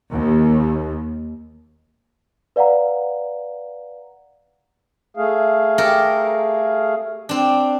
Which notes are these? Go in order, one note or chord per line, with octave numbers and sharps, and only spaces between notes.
D#2
B4 D5 F5 F#5 A#5
A3 G#4 F5
G4 A4 A#4
C4 D4